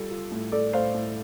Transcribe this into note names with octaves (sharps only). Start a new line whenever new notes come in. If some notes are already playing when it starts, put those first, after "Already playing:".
Already playing: G3 F4 A4
F4
A2
A2 A4 D5
A2 C5 F5
A2